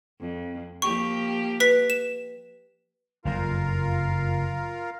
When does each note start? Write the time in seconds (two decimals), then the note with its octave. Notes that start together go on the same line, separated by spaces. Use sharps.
0.20 F2
0.82 F3 A#3 G4 C#6
1.60 B4 B6
1.90 E7
3.25 F#1 F2 F4 A#4 F5